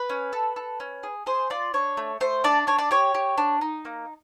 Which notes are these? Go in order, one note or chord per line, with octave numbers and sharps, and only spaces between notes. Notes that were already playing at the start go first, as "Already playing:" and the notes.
Already playing: B4
C#4
A4
A4
C#4
G#4
G#4 C5
F4 D5
D4 C#5
A3
A3 C5
D4 D5
D4 C#5
D5
G4 C#5
G4
D4
D#4
A#3